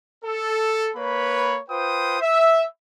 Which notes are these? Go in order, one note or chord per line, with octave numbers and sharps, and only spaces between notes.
A4
A#3 B4 C#5 B5
F4 B4 C5 G5 D#6
E5